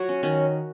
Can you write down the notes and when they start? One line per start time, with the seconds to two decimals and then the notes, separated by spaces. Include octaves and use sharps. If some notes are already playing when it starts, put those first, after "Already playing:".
Already playing: F#3 F#4 C#5
0.09 C#4
0.23 D#3 C#4